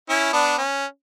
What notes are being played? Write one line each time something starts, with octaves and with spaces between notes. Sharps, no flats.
C#4 E4
B3 D4
C#4